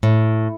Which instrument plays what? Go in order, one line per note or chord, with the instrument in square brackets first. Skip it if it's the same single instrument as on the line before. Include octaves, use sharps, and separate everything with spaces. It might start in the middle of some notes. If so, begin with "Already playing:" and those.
[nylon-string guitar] A2